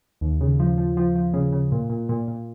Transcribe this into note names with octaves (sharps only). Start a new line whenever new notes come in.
D#2
C#3
F3
F3
F3
F3
C#3
C#3
A#2
A#2
A#2
A#2